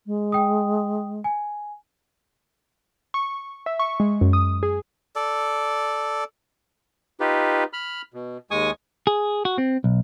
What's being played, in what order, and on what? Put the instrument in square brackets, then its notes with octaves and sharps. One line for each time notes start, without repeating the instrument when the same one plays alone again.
[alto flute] G#3
[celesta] G5 D#6
G#5
[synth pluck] C#6
E5
C#6
G#3
F#2
D#6
G#4
[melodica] A4 D5
[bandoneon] D#4 F4 G4 B4
B5 F6
B2
D#2 G#3 G#5 C#6 D#6
[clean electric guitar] G#4
F#4
C4
B1